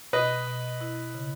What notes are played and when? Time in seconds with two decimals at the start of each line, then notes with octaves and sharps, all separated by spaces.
0.13 B2 B4 D#5
0.47 B2
0.81 E4
1.14 C#3